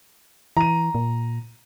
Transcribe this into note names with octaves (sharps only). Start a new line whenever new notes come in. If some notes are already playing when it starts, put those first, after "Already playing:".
E3 A#5 D#7
A#2